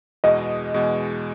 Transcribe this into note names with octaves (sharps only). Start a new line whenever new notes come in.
E2 B2 G#3 D#5
E2 B2 G#3